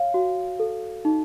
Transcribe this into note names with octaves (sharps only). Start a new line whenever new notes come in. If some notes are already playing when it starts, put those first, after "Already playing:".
Already playing: C#5 F5
F#4
A4
D#4